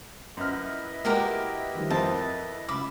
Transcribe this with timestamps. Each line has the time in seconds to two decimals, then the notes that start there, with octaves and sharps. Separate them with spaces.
0.37 F#2 E4 B4 D#5 F6
1.05 G#3 A#3 F#4 G4 A#4 D6 F6
1.75 D#3 F3 G3
1.90 F2 C4 A#4 E5 A5
2.69 C#2 E5 B5 D6